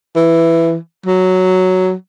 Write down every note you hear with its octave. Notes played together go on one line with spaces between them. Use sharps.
E3
F#3